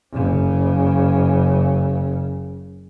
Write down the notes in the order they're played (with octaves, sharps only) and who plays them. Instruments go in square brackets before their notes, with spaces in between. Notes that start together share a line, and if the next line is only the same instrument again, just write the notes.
[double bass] F#1 C#3